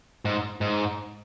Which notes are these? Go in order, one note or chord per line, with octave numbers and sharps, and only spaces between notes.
G#2
G#2